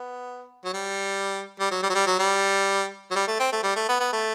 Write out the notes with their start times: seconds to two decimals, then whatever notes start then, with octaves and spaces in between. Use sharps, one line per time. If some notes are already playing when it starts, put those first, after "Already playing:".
Already playing: B3
0.65 F#3
0.74 G3
1.60 G3
1.71 F#3
1.83 G3
1.90 F#3
1.95 G3
2.07 F#3
2.19 G3
3.11 F#3
3.16 G3
3.28 A3
3.40 C4
3.52 A3
3.64 G3
3.76 A3
3.89 B3
4.00 B3
4.13 A3